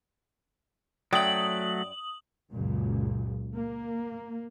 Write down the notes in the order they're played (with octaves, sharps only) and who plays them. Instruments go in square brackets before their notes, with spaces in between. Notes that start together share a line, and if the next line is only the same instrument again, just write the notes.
[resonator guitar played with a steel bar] F#2 D5 G5 [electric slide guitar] F#3 A3 [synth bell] D#6 F#7
[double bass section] C#2 F#2 A#2
A#3